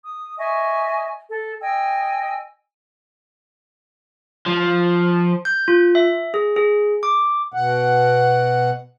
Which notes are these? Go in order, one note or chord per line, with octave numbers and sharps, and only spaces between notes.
D#6
D#5 E5 G#5 C#6
A4
D#5 G5 G#5 E6
F3
G6
F4
E5
G#4
G#4
D6
B2 F#5